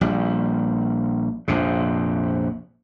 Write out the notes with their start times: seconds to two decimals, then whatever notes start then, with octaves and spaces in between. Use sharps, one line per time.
0.01 A#1 G3
1.48 A#1 F2 C3